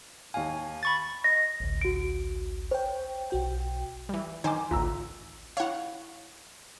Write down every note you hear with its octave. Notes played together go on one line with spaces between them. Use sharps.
D#2 F5 G#5
B5 C#6 A6
D#5 A#6
A1 D2
F#4 D7
C5 C#5 G5
B1 F#4 G5
E3 G3
D#3 D#4 C5 G#5 D6
A1 D2 F4 A#5 E6
E4 C#5 F5 F#5